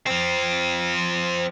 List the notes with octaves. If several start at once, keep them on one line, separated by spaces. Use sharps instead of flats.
F3 C4